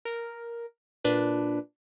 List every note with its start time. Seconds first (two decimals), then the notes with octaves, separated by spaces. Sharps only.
0.05 A#4
1.04 A#2 D4 B4